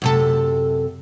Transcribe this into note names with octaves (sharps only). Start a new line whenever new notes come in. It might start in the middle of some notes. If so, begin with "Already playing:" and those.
F#2 C3 A4